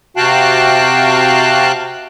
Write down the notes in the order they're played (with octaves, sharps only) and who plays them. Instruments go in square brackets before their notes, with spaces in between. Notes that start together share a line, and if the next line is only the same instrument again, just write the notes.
[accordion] C3 F#4 F5 G5 A5 F#6